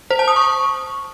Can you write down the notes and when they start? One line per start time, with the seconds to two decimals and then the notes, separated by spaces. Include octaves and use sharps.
0.10 C5
0.19 A5
0.28 D#6
0.36 C#6